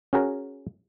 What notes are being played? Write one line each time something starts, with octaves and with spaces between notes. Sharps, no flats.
C#4 F#4 G#4 A#4 C#5